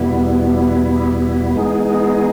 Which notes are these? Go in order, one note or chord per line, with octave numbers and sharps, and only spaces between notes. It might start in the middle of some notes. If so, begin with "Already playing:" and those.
Already playing: E2 B2 G3 B3 E4
E3 G#3 B3 D#4 G#4